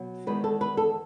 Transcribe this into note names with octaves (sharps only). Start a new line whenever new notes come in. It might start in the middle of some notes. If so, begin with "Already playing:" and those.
Already playing: B2 F#3
E2 D#3 G#3 B4
A4
B4
A4